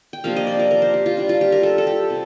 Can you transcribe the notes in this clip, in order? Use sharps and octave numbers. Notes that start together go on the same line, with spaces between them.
G5
C3 F3 A#3 D4 F5
D#5
D5
A#4
A#4
C5
G4
F4
G3 D4 F4
F4
G4
A#4
A4
A4
G4
C3